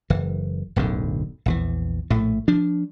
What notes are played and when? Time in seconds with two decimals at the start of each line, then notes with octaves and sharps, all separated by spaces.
0.10 F#1 E3
0.76 D1 B1 F#2 D3
1.46 A#1 E2 E3
2.10 A#1 A2 A3
2.48 F3 D4